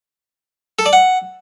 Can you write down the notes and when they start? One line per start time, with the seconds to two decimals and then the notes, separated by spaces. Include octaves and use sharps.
0.79 A4
0.86 D5
0.93 F#5